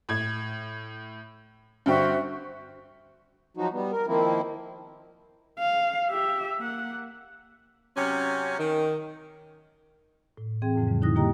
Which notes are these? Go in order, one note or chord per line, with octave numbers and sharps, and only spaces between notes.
A2 G#6
G2 D3 F#4 C5 E5 G5
F3 F#3 D#4 F#4
G3 B3
A#4
D#3 F3 A#3 C4 E4
F5
G4 E5
A#3 F#5
C3 F#3 C#4
D#3
A2
E3 C4 G#4 G5 G#6
F2 A2 C#3 F3
C#3 G3
D3 D#4 E4 D#6 F#6 A#6
A#3 E4 G4 D#5 G5 A#5